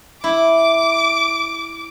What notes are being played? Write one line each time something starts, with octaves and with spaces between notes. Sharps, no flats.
E4 D6